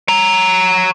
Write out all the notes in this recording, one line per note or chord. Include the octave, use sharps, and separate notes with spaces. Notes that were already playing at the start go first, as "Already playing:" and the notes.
C#5 A#5